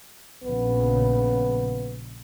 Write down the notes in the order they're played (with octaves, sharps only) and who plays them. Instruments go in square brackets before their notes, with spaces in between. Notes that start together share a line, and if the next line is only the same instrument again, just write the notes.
[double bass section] A#1 C#3 [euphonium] B3